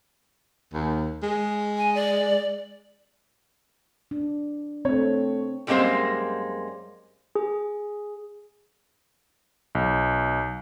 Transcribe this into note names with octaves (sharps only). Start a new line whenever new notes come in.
D#2
G#3
G#5
D5
D4
A3 C4 C#5
F#2 G3 G#3 A#3 C4 C5
G#4
B1